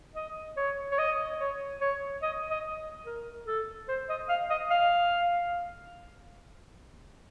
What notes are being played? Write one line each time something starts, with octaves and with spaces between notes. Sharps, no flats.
D#5
C#5
C#5
D#5
C#5
C#5
D#5
D#5
A#4
A4
C5
D#5
F5
D#5
F5